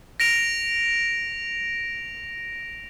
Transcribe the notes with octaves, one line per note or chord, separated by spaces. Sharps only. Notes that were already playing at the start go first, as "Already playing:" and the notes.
A#6 D7 F7